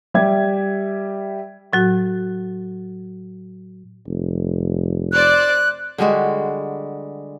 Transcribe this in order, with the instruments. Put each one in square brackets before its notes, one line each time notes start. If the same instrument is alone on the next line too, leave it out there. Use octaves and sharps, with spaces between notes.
[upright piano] G3 G4 E5 G#6
[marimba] A2 F#3 F#4
[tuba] F1
[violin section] C5 D5 [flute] F#6
[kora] D3 G3 G#3 F#4